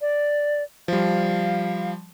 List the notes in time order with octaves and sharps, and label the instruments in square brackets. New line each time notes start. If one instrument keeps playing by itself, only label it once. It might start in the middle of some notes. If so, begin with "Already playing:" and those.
[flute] D5
[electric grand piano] F3 G3 [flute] F5